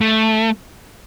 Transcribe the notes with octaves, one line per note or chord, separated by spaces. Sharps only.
A3